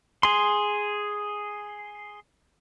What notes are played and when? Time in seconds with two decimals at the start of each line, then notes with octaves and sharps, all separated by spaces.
0.23 G#4 C6